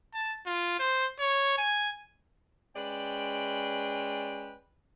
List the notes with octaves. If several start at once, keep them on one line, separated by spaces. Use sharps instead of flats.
A5
F4
C5
C#5
G#5
G#3 C#4 B4 D5 G5